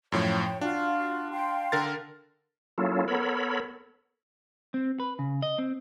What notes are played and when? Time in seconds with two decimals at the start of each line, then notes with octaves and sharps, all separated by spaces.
0.12 F#2 A2 F3 C#5 G5
0.61 D4 F4 F#4 F5
1.31 F5 G5 C6
1.72 D3 A#4 A6
2.78 F#3 A#3 C#4 E4 F4 A4
3.08 B3 A4 A#4 C#5 B5
4.74 C4
5.00 B4
5.19 C#3
5.42 D#5
5.58 C4